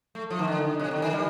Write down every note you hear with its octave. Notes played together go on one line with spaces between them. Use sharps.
A3
F3
D#3
D3
C3
D3
D#3
G3